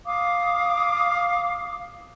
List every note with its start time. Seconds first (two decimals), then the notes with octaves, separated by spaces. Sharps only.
0.05 F5 D6 D#6